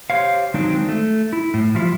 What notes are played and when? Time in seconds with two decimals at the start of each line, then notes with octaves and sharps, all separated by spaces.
0.10 G4 G#4 C5 C#5 F5
0.54 D#3 F#3 G#3 C4 D4 D#4
0.89 A3
1.33 E4
1.54 A2
1.75 F3 G3 E4 F4